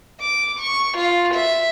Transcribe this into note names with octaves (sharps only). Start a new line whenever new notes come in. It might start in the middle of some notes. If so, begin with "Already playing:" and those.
D6
C#6
F4
E5